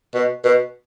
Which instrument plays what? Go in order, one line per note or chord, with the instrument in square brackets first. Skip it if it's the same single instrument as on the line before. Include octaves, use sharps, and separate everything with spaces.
[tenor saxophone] B2
B2